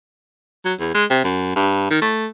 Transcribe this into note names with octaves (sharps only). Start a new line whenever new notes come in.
F#3
E2
G#3
C3
F#2
G2
D#3
A3